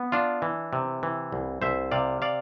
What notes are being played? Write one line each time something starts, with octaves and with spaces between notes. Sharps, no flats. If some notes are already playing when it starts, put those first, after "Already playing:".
Already playing: B3
D4 F4
E3
C3
E3
C2
C2 C5 E5
C3 D5 F5
D5 F5